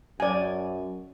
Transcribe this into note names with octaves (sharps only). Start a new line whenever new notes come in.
F#2 D5 G#5